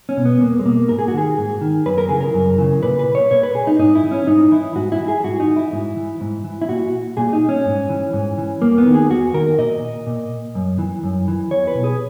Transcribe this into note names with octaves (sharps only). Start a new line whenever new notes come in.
C#4
B2
B3
E2 A#3
G#3
B2 A#3
G#2 A#4
G#4
F#4
D#3 G#4
G#2
D#3
F#2 B4
A#4
C#3 E3 G#4
A#4
F#2
C#3 E3
A#2 B4
B4
C#5
A#2 C#5
B4
G#4
D#4
G#2 D#4
E4
E3
C#4
G#2 D#4
E3 E4
G#2 F#4
E4
E3
G#4
G#2 F#4
D#4
E3
E4
G#2
E3
G#2
E3
E4
A#2 F#4
A#2 G#4
D#4
C#4
G#2
E3
G#2
E3
E2 A#3
B3
D#3
G#4
E2 F#4
D#3 A#4
A#2 D#5
A#2
F#2
E3
F#2
E3
E2 C#5
B4
B2
G#4